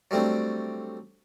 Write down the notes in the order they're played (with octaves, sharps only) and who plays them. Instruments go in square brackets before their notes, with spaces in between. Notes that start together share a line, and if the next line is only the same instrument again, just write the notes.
[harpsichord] F#3 G3 A3 C4 D4